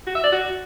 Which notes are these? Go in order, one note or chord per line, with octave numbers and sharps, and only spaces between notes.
F#4
E5
D5
F#4